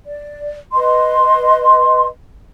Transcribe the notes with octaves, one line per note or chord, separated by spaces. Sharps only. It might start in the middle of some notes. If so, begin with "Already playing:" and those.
D5
B4 D#5 C6